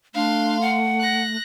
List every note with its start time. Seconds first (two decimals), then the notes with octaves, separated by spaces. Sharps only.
0.14 A3 D4 F5 C6
0.61 F#5
1.00 F#6 A#6